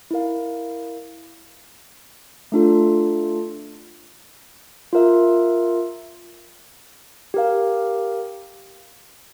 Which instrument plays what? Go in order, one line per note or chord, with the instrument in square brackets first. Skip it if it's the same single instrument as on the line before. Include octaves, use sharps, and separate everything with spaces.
[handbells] E4 A#4 F5
A3 D4 F4 A4
F4 A#4 E5
G4 A#4 F5